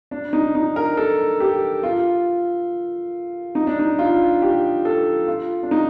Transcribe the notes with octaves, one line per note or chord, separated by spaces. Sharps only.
D4
D#4
D#4
A#4
A4
G4
F4
D#4
D4
D#4
F4
G4
A4
F4
D4
D#4